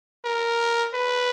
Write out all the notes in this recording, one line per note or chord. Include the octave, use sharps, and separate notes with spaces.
A#4
B4